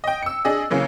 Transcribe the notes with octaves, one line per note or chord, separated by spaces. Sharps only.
D#5 G5
E6 C#7
D4 G#4 D#5
C#3 E3 F#3 A#3